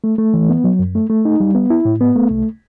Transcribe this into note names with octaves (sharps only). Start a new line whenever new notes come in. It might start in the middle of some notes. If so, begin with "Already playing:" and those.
A3
A3
E3
B3
F#3
F#2
A3
A3
D#4
G3
B3
E4
A2
B3
A3
C2